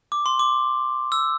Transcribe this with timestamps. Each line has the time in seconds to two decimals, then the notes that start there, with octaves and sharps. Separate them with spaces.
0.12 D6
0.26 C6
0.39 D6
1.12 E6